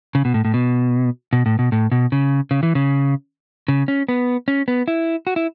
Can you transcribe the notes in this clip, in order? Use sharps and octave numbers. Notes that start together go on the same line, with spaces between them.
C#3
B2
A2
A2
B2
B2
A2
B2
A2
B2
C#3
C#3
E3
C#3
C#3
C#4
B3
C#4
B3
E4
F#4
E4